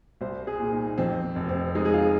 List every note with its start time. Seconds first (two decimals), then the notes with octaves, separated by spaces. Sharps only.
0.21 C2 C5
0.47 G#4
0.60 A#2
0.72 D#4
0.98 F2 C4
1.36 F1
1.49 C4
1.75 G#3 D#4
1.85 G#4
1.94 F4